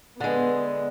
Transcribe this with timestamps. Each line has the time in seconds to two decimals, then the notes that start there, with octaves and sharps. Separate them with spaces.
0.20 D3 G#3 B3